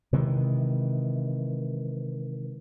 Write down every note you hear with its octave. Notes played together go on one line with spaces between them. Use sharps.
C3 D#3 E3 G#3